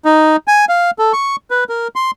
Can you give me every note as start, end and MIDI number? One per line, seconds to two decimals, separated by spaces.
0.05 0.36 63
0.47 0.65 80
0.69 0.91 77
0.99 1.13 69
1.13 1.36 85
1.50 1.64 71
1.69 1.88 70
1.95 2.11 84